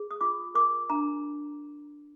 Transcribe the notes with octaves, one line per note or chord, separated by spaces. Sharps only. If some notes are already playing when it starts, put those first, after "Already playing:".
Already playing: G#4
D#6
F4 D6
A#4 D6
D4 A#5